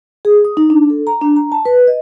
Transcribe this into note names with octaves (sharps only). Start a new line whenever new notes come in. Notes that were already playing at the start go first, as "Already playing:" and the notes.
G#4
D#6
D#4
D4
A4
A#5
D4
A#5
A5
B4
D#5